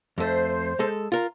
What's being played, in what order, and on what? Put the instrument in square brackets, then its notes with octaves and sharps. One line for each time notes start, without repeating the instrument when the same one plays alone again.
[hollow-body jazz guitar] F2 A3 [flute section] C5
[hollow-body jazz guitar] G#3 A4
F4 A#4